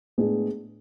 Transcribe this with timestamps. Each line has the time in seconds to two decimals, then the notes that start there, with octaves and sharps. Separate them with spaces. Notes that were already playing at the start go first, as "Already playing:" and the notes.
0.18 A2 G#3 B3 D4 G#4